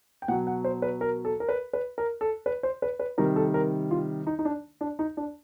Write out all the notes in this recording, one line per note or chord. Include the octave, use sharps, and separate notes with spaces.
G5
B2 F#3 F#5
F#5
C5
B4
A#4
A4
A#4
B4
B4
A#4
A4
B4
C5
B4
B4
C3 D#3 G3 A#4
A4
A#4
F4
D#4
D#4
D4
D4
D#4
D4